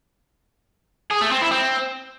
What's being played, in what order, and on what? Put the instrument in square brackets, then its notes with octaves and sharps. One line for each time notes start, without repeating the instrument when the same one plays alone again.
[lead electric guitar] G#4
A3
C4
E4
C4